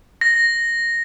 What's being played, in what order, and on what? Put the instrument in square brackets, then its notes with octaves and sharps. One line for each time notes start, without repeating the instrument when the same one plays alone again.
[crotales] A#6